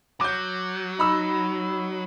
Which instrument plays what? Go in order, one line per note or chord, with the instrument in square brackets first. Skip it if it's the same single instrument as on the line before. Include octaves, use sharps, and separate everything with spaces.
[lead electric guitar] F#3 [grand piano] D6 G6
[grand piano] D#4 B5 E6